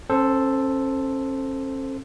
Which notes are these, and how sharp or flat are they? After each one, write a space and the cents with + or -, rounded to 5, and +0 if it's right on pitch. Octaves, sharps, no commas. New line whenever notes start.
C#4 -45 A4 +0 C5 +0